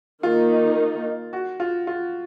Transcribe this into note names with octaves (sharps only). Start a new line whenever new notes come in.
D#3 A#3 D#4 F4
F#4
F4
F4